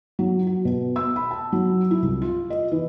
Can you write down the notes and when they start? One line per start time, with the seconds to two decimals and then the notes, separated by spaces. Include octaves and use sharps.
0.19 F#3
0.47 F#4
0.65 B2
0.96 E6
1.16 B5
1.31 A5
1.53 F#3
1.91 E4
2.02 C2
2.22 F4
2.50 D#5
2.72 E3